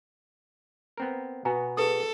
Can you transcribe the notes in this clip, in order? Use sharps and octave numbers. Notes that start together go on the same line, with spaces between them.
B3 C4 A#4
B2 B3 F#4 B4 G#5 A#5
G#4 A4 B4 D#6